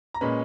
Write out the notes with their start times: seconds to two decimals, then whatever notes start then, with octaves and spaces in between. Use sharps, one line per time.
0.14 A#5
0.21 A#2 G#3 C#4 B4 B5